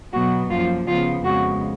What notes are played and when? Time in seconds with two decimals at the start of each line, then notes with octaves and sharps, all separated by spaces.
0.12 B2 F#3 B3 F#4
0.50 F#2 F3 A#3 F4
0.86 C#3 F3 B3 F4
1.24 F2 C#3 G#3 B3 F#4